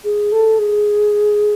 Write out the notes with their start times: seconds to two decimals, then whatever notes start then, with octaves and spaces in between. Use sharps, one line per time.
0.04 G#4
0.32 A4
0.59 G#4